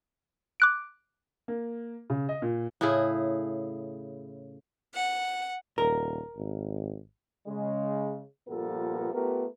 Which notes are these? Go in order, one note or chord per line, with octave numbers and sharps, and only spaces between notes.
D6 F#6 D7
A#3
C#3
D#5
A#2
A2 C#3 E4 G#4
F#5
D#1 A#4
G#1
C#3 G#3
G2 A#2 F3 B3 A4 A#4
A3 B3 F4 G4 A#4